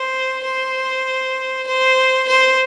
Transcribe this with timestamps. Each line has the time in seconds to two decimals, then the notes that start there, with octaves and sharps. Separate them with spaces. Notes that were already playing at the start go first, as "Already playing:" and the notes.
Already playing: C5
0.44 C5
1.67 C5
2.28 C5